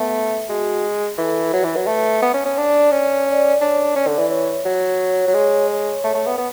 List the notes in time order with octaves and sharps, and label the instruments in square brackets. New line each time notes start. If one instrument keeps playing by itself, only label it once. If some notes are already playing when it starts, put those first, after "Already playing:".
Already playing: [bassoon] A3 [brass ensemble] B3
[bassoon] G#3 [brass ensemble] F#4
[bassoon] E3 [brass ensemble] A4
[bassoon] F#3 [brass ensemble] B4
[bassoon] E3
F#3
A3
B3
C#4
C#4
[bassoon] D4 [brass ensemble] D5
[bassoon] C#4 [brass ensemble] D5
[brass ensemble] D5
[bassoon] D4 [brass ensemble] C#5
[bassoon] C#4 [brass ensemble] D5
[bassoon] D3
E3
[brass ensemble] C#5
[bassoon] F#3 [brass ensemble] C#5
[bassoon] F#3
G#3
[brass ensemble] C#5
[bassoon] A3
A3
B3
B3